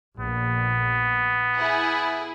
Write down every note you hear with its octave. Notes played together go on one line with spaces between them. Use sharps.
A#1 B3
E4 G#4